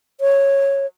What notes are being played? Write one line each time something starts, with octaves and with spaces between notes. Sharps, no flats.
C#5